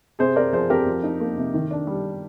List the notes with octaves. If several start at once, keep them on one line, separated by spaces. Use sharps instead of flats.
C3 G#4 C5
C4 A#4 D5
F3 G#4 C5
F2 G4 A#4
F3
D#4
A#3
C3
D#3
D4
G3